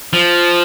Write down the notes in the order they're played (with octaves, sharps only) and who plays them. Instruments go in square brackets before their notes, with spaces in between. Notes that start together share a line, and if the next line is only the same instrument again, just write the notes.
[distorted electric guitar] F3